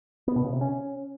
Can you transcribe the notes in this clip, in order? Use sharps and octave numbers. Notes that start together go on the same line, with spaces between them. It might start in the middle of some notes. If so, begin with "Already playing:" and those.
B3
B2
C#3
C3
C#4